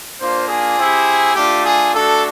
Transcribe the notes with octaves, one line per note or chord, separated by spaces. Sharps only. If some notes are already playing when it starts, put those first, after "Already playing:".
A#3 D4 F4 C5
G#4
C4 E4 G4
A3 D4 F4 G4
G#4
A3 D4 F#4 A4